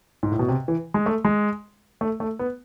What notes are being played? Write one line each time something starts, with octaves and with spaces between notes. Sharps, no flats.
G#2
A2
B2
C3
E3
G#3
A3
G#3
A3
A3
B3